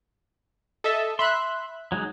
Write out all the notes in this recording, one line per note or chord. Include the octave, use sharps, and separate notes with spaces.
A4 D#5 E5
E5 B5 C6 F#6
F#3 G#3 D#4